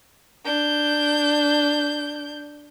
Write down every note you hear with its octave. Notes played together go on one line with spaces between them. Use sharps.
D4 G6